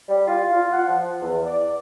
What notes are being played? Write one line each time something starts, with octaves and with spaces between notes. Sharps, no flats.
G3
F4
F4
F#5
F3
E2
D5